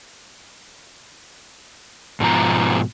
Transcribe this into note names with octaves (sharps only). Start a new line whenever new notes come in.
G#2 B2 F3 A#5